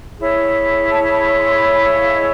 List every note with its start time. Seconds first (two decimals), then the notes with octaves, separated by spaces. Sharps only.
0.19 E4 G#4 C#5
0.88 A5
1.05 B5
1.23 C#6
1.40 C6
1.53 C6
1.57 B5
1.92 F5
2.14 D#5